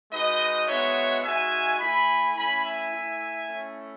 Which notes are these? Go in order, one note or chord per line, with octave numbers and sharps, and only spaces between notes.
G#3 D#4 F#4 B4 D#5
G#3 B3 D#4 F#4 C#5 E5
G#3 D#4 F#4 E5 G#5
A3 E4 G#5 B5
A3 C#4 E4 G#5 B5
E5 G#5
A3 E4
A3 C#4 E4